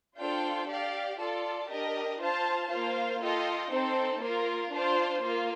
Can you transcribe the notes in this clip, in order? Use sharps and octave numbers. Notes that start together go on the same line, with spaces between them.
D4 F4 A4 C5 G5
G4 D5 F5
F4 A4 D5 A5
D4 G4 A#4 D#5
F4 C5 F5 A5
A#3 F4 C5 F5
F4 A4 D#5 G5
C4 D#4 A4 C5
A#3 F4 A#4
D4 F4 C5
A#3 F4